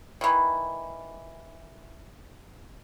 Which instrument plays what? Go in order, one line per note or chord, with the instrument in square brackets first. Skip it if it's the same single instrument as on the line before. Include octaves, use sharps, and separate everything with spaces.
[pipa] D#3 E3